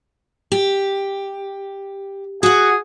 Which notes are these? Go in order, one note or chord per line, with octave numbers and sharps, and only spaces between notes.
G4
F#4 G#4 F#5